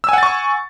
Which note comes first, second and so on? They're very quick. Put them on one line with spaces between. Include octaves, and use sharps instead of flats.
E6 G#5 F#5 A6 C#6